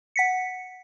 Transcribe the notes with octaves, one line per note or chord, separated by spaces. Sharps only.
F#5 B6 C#7